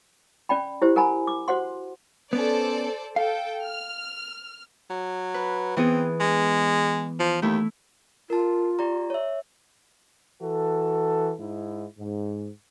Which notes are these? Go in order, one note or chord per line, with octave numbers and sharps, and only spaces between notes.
C#4 D5 G5 B5
E4 G4 C5
A#4 F#5 G#5 A#5 B5
D6
F#4 C5 F#5 C6
B3 C#4 A4 C5 D5
A4 F5 G5
F6
F#3
B4
E3 B3 C4 G#4
G#3
F3
D#2 A3 E4
F4 A#4 A5
G4 D5 A#5
C#5 E5
E3 F#4 A4
G#2 D#4 E4
G#2